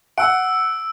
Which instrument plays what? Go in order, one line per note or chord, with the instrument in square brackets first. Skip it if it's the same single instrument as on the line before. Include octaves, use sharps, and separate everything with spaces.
[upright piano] F#5 [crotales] E6 D7